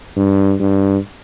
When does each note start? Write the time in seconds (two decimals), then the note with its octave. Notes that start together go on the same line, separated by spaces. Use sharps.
0.17 G2
0.60 G2